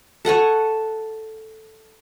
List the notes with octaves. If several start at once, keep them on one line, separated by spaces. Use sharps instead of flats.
A4 F#5 G#5 C#6